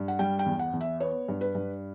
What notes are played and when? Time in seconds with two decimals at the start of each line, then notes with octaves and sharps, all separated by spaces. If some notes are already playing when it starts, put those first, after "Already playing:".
Already playing: G2
0.08 F#5
0.19 G3 G5
0.39 G5
0.46 E2
0.59 F#5
0.73 E2
0.81 E5
1.00 B3 C#5
1.28 G2
1.41 B4
1.55 G2